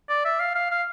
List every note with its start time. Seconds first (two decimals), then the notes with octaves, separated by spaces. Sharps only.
0.09 D5
0.25 E5
0.40 F5
0.55 F5
0.71 F5